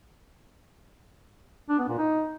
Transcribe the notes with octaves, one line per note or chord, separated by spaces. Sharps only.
D4
B3
A#2
D#4